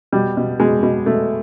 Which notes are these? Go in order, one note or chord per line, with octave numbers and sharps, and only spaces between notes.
B2 G3
B2
B2 G#3
B2
B2 A3